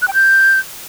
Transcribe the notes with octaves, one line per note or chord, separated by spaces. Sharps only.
F#6
G5
G6